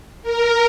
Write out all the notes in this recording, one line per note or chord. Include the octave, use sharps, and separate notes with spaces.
A#4